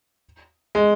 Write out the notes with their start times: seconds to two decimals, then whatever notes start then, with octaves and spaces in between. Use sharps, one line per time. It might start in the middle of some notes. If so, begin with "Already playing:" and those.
0.75 G#3